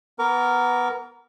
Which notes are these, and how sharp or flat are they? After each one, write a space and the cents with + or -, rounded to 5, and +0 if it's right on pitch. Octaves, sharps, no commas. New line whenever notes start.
B3 +0 A#4 +0 D6 -45